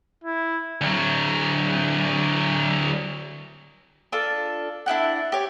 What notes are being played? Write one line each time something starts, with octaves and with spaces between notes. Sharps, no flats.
E4
D2 F#3
D4 F4 A4
D4 E4 G4 F#5
G4 C#5